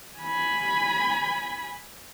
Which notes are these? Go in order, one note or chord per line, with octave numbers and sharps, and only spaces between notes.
G#5 B5